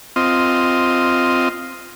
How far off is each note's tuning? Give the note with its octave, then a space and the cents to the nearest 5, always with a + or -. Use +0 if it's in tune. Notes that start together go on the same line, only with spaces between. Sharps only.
C4 -5 F4 +0 D#5 +0